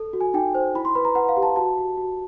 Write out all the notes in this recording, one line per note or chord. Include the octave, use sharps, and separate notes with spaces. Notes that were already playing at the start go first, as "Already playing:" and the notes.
Already playing: A4
F#4
G#5
D#4 G5
C5
E4 B5
C6
B4 B5
A#5
B4 F#5
F5
G4
A5
F#4 A5
F#4
F#4